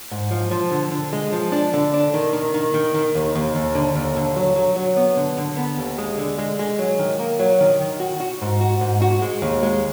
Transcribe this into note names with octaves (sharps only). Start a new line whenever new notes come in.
G#2
F3
F3
D3
D3
G#3
F3
D4
D3
D4
D#3
D#3
D#3
D#3
D#3
D#2
D#2
D#2
D3
D#2
D3
F#3
F#3
F#3
B3
D3
D3
B3
D#2
G#3
D3
G#3
G#3
F#3
D#3
A#3
F#3
D#3
D#3
F#4
F#4
G#2
F#4
G#2
F#4
G#3
D#2
G#3